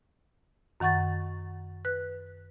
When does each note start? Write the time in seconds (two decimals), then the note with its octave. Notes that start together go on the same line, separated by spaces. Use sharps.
0.80 F#2 D#3 F#5 C#6 A6
1.85 B4 F#6